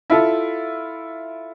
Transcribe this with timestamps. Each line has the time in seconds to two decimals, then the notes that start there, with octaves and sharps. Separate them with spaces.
0.10 E4 F4 A4